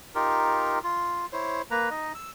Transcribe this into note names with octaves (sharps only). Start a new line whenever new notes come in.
D#4 F4 G4 A#4
F4
E4 C5 C#5
A#3 B4 A#5
D#4 D#5
E6